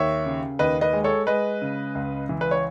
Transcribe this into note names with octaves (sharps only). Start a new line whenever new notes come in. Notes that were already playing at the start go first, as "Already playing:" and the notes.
Already playing: D#2 C#5 E5
C#3
D#2 B4 D#5
B4 D#5
G#3
A4 C#5
G#3 B4 D#5
C#3
C#2
E3
B4
C#5